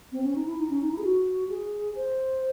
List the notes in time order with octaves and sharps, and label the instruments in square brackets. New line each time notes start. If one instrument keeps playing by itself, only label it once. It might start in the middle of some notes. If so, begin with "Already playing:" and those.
[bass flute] C4
C#4
D#4
E4
D#4
C#4
D#4
E4
G#4
F#4
G#4
C5